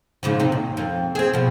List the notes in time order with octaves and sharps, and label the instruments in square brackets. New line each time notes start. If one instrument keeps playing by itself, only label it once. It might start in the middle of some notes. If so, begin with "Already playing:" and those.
[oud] G#2 C#3 F3
C3 D#4
D#2
F2
C4 G#4
B2 F3